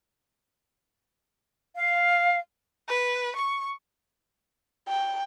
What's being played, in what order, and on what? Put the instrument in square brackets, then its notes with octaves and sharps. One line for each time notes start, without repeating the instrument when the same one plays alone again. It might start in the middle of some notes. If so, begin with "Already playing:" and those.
[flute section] F5
[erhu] B4
C#6
G5